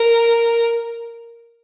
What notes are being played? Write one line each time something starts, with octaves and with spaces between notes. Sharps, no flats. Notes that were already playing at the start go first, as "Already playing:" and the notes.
Already playing: A#4